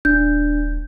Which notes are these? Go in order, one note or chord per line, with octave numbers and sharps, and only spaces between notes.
D#1 D4 G6